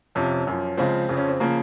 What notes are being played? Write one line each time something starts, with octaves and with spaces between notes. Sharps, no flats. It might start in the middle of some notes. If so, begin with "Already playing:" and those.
F2 C3 F3 C#4
F#2 F3
C#2 C#3 F3 C4
F2 C#3 F3
C#4
C4
C#3 F3 A#3